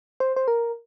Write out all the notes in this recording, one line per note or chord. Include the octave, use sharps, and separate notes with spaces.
C5
C5
A#4